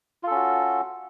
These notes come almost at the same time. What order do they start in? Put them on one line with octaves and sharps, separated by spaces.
F4 A4 C#4 F#4